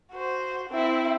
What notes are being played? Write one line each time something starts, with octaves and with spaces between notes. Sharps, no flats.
F#4 C5
C4 E4